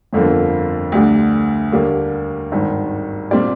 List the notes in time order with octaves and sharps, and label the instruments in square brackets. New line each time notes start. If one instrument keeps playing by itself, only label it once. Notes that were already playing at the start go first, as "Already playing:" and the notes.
[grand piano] G1 F2 D3 F3 A#3
D2 D3 G3
D#2 D3 G3 A#3
G#1 G2 D#3
A#2 G3 C4 G4 D5